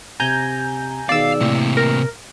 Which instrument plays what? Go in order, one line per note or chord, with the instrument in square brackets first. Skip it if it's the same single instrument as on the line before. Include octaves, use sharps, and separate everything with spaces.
[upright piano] C3 [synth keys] G#5 A#5 G6
[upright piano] B2 D#3 G#4 [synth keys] D5 E6 [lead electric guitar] F5
[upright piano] A2 [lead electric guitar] C3 A#3
[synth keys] A#4